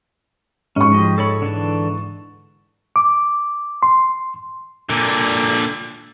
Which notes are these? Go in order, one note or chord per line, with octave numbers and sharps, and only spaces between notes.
G#2 C#4 C#6
F3 G4 D#5
A4 C#5 B5
D3 E3 A5
D6
C6
A#2 D3